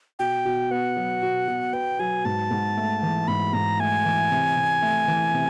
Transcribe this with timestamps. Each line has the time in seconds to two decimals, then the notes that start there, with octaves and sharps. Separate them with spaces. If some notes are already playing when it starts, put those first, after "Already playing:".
0.19 B2 G5
0.45 B2
0.71 B3 F#5
0.97 F#3
1.22 B2
1.48 B2
1.73 B3 G5
1.99 F#3 G#5
2.25 G#2 A5
2.51 G#2
2.77 A3
3.02 E3
3.28 G#2 B5
3.53 G#2 A#5
3.79 A3 G#5
4.05 E3
4.31 C3
4.56 C3
4.82 A3
5.08 E3
5.34 C3